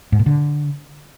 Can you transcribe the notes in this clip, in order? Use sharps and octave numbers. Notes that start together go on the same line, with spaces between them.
G#2
A#2
D3